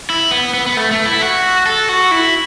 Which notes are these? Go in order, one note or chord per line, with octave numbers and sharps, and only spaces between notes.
E4
B3
B3
B3
A3
A3
E4
F#4
A4
F#4
E4